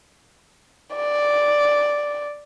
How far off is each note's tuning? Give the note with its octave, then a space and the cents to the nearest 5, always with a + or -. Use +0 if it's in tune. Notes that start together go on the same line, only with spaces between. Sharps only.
D5 +0